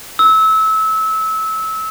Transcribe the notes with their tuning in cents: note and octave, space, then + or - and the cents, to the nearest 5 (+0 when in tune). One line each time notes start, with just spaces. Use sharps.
E6 -25